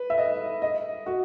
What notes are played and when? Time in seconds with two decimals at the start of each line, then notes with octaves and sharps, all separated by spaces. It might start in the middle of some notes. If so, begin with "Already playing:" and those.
Already playing: B4
0.10 E5
0.18 D#5
0.62 D#5
1.06 F#4